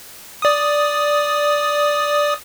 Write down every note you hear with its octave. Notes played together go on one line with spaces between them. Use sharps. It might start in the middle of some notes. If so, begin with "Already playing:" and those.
D5 D#6